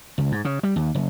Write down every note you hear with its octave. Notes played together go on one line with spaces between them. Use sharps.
C#2
G#2
C#3
G3
D#2
F#1